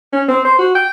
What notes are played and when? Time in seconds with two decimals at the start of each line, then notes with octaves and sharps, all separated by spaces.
0.13 C#4
0.28 C4
0.45 C5
0.59 F#4
0.75 G5